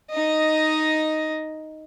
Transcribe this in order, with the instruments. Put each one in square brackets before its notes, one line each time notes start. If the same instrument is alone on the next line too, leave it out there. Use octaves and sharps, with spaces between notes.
[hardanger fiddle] D#4 D#5